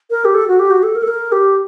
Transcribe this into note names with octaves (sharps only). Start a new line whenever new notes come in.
A#4
G4
A4
F#4
G4
F#4
A4
A#4
A4
A#4
G4